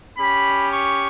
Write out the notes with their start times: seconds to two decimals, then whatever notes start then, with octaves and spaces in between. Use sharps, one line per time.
0.17 C#4 G4 B5
0.73 C#6